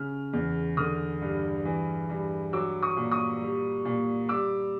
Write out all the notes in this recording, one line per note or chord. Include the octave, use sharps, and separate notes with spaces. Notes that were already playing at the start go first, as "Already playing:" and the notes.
Already playing: C#3 F6
E2
D3 D#6 F6
G2
E3
G2
F#3 D6 E6
C#6 D#6
A#2
C#6 D#6
G3
A#2
G3 D6 E6